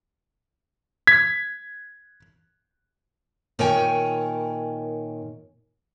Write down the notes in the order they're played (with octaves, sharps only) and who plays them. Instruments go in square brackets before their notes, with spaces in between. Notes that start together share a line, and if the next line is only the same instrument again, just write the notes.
[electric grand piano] G#6 B6
[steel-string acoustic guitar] A#2 D#3 A#4 C#5 G5 G#5